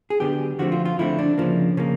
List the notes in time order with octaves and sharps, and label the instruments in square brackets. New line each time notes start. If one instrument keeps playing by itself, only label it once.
[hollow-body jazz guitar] G#4
D3 F#3 B3 G4
D3 F3 A3 C4 F#4
F4
F4
D3 F3 A3 C4 E4
D4
C#3 F3 A#3
C#3 F3 A#3